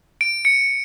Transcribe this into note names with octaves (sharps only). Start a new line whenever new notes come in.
D7
C#7